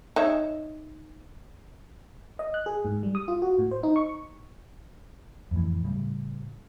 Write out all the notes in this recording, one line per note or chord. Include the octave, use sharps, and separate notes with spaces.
D#4 C#5 E5
D#5
F#6
G#4
G#2
G3
D#6
F4
F#4
A2
C5
D#4
C#6
F2 A2 E3
A2 C#3 G3